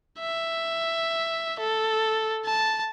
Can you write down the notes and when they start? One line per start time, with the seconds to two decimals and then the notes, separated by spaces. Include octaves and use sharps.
0.20 E5
1.60 A4
2.46 A5